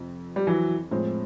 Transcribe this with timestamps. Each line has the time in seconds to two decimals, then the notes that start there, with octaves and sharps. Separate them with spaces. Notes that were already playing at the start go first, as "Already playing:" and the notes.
Already playing: F2 C3
0.36 G3
0.47 E3 F#3
0.91 A2 F3 G#3 C4